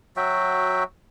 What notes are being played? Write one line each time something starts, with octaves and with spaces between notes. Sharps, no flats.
F#3 F#4 E5 G5